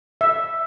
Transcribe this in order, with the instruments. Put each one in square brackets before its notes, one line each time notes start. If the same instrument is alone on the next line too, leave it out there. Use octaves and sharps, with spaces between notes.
[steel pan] E5